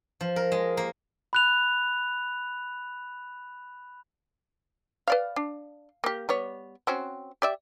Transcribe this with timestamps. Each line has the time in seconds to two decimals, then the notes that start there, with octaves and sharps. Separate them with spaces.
0.21 F3
0.36 A#4
0.52 G#3
0.77 A#3
1.33 B5 F#6 F7
5.08 B4 D5 F5
5.36 D4
6.04 A#3 G4
6.29 G3 B3 C#5
6.87 C4 C#4 F#4
7.42 G4 D5 E5